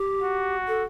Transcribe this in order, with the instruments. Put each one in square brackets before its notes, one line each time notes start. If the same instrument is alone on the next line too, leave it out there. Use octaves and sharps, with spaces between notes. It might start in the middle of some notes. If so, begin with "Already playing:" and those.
Already playing: [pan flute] G4
[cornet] F#4
[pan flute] A4